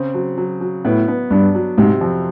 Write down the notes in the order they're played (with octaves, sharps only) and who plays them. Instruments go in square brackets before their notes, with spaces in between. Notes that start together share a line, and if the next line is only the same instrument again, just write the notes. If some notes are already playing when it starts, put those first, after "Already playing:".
Already playing: [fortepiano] C#3 C4
F#3
F#3
F#3
[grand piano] A2 [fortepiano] B3
[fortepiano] B3
[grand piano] G2 [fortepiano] D4
[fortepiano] F#3
[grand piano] G#2 [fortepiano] C3
[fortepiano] F2